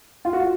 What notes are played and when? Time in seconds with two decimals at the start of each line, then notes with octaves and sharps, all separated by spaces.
0.25 F4
0.33 F#4